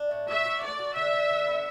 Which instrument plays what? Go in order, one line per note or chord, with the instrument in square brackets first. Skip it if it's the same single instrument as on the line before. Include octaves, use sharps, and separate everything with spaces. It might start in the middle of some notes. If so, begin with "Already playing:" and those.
Already playing: [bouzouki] D4
A2
[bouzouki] F#4 [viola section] E5
[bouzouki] F#4
[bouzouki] A3 [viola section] D5
[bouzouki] F#4
[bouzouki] D3 [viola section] E5
[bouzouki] D3
D3
B3